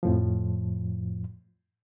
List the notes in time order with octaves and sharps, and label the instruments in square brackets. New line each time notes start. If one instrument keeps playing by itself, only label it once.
[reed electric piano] F2 A2 F3